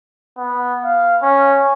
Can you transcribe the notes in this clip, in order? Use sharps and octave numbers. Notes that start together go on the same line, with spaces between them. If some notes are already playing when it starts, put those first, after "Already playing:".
B3
F5
C#4